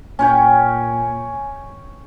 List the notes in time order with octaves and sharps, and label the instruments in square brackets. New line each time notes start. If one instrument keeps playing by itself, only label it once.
[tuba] A#2 [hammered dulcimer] C#4 C#5 G5 [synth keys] G#5